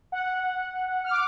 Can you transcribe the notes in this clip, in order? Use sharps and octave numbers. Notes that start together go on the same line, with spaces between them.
F#5
F6
D6